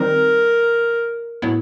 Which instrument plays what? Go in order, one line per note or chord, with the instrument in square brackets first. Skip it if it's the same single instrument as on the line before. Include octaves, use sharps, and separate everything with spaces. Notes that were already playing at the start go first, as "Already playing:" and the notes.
Already playing: [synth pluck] D#3 G3 C4 D#4 [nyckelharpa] A#4
[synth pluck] A2 F#3 B3 E4